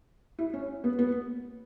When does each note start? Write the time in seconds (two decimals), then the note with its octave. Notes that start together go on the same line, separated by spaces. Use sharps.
0.39 E4
0.54 C#4
0.84 B3
0.99 B3